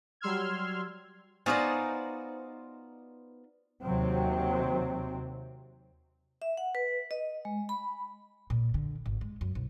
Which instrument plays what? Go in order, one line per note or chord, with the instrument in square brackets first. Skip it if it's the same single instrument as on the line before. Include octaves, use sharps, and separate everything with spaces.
[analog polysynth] F#3 G3 C6 E6 F6 G#6
[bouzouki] B3 C5 D5 [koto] D#4 F4 F#4 [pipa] G#4
[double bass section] D#2 C3 F#3 C4
[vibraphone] E5
F#5
B4
D#5
G#3
B5
[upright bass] A#2
D3
G#1
G#3
F#2
B1